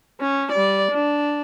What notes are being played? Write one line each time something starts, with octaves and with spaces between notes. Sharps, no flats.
C#4
G3 D5
D4